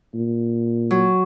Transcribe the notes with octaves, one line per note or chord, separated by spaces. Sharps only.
A#2
F#3